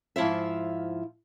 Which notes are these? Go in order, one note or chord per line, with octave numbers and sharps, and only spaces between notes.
G#2 F3 E4 F4 E5